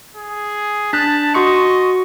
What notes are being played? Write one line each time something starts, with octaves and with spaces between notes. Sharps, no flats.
G#4
D4 A5 F#6 A6 B6
F#4 D#5 C6 C#6 C#7